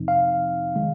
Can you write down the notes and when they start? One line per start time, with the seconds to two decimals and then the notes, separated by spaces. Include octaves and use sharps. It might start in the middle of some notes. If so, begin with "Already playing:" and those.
Already playing: F2 C3 F3 C4 D#4
0.08 F5
0.76 D#3 G#3